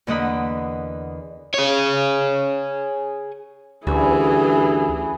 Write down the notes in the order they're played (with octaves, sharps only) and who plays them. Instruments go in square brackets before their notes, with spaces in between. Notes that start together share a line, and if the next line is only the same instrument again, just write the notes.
[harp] E2 D3 A#3 D#5 F#5 B5
[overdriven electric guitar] G#4 C#5
[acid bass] D2 [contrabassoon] G2 [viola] E3 G#4 [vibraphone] C#4 G#5 B5